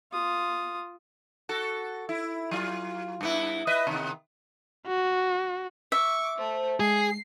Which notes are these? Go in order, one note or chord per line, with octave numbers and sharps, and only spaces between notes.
F4 D#6
F#4 A4
E4
F#3 F4
G2 B3 E4
B4 D#5 E5
C3 D#3 B3
F#4
E5 C#6 D6
A3 C5
G#3 G#4 C7